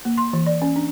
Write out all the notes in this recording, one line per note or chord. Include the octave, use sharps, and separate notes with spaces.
A#3
C6
E3
D5
C#4
D4